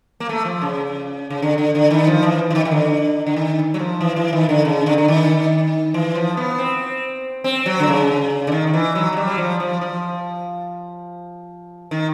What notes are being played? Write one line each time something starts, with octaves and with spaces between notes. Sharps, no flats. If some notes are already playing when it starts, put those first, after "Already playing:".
A#3
A3
F3
C#3
C#3
D3
D3
D3
D#3
F3
E3
E3
D#3
D#3
D3
D3
D#3
F#3
F3
E3
E3
D#3
D3
C#3
D3
D3
D#3
E3
F3
B3
C4
C4
F#3
D3
C#3
D3
D#3
D#3
E3
F#3
F#3
G3
F#3
F3
F3
F3
D#3